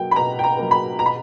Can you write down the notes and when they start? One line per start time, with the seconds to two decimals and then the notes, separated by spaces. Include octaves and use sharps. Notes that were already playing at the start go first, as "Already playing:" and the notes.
Already playing: B2 F#3 A#3 G5
0.11 B5
0.16 B2 A#5
0.39 G5
0.44 A#5
0.57 F#3 A#3
0.71 B5
0.99 B2 A#5
1.06 B5